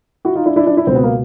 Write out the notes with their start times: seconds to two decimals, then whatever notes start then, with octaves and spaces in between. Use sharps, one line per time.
0.25 E4 F#4
0.35 D#4 F4
0.46 D4 E4
0.56 D4 E4
0.67 D4 E4
0.77 D4 E4
0.87 C#2 C4
0.90 B2 B3
1.03 A#3